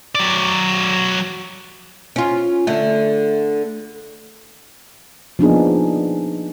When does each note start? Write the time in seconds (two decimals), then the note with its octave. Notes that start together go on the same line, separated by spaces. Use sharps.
0.15 F#3 D5
2.16 C#4 F4
2.67 D3 A3
5.39 F3 A#3 B3 D4 D#4 G#4